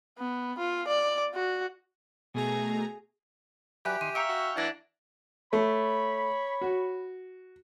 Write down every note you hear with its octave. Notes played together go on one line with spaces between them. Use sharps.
B3
F4
D5
F#4
B2 A3 G#4 A#5
F#3 G4 B4 D5 E5 G#5 F#6
D#3 C6 D#7
E5 F5 G5 A#5 C#6 C#7 D7
F#4
E3 D4 E4 F#5 G#6 A#6
A3 C#5 B5
F#4